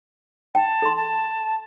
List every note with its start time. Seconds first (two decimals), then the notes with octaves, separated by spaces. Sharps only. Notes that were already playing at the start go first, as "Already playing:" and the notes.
0.55 G5 A5
0.82 A4 C6
0.97 A5